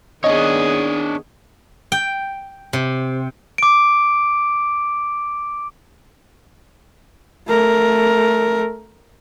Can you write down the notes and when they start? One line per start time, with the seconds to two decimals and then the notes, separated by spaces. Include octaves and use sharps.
0.24 D#3 B3 D4 G#4 C#5 D#5
1.92 G5
2.73 C3
3.58 D6 D7
7.48 A3 A#4